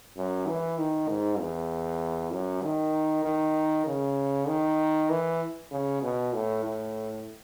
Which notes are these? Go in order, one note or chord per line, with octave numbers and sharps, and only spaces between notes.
F#2
E3
D#3
G#2
E2
F#2
D#3
D#3
C#3
D#3
E3
C#3
B2
A2
A2